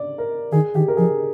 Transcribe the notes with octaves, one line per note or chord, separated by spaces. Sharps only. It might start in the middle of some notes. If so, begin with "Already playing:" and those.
Already playing: D5
A#4
D#3 G#4
D#3 G4
A#4
F3 G#4